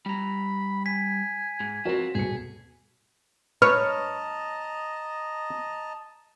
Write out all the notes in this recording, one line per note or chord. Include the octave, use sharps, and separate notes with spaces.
G3 A#5 B5
G#5 B6
G#2
F3 C4 F#4 A#4
D#1 B2 G#4 C#7
B4 C#5 D#5 A5 A#5 F6